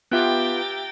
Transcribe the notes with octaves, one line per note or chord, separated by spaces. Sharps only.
B3 F4 G4 E5 G5 A#5 F#6 A6